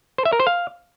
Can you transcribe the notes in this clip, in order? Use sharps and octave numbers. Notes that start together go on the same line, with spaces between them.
C5
E5
A#4
C5
F5